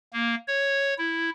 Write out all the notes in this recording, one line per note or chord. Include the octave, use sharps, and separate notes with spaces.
A#3
C#5
E4